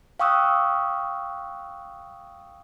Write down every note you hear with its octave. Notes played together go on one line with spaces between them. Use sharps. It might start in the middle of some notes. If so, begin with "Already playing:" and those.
F5 G5 C#6 D#6 E6 F#6